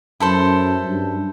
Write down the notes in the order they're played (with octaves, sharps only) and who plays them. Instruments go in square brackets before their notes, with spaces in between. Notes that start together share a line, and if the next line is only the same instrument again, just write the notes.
[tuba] F#2 [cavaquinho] E4 A4 C5
[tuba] G2